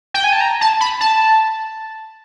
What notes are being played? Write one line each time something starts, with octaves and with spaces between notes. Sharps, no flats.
G5
G#5
A5
A#5
A5
B5
A5